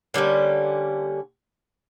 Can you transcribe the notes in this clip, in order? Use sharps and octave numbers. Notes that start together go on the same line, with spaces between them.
D3 G3 A#3 C#4